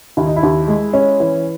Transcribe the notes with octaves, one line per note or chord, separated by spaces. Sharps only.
D#2 E4
D#4
E4
D#2
G#3
C#4
E3